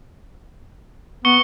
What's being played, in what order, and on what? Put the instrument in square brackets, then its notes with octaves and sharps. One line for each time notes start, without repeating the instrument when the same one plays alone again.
[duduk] B3 [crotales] C#6 C#7 G7